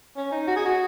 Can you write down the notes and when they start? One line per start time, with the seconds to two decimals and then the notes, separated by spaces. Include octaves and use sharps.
0.16 C#4
0.32 D#4
0.47 F#4
0.56 G#4
0.65 F#4